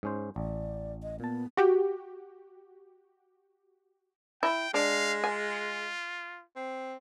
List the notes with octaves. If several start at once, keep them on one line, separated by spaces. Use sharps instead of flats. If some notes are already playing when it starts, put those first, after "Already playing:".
G#2 C#4 C5
A1 D5
D#5
A#2 B3 A5
F#4 G4
E4 G5
G#3 D4 F5
F4 G#5
C4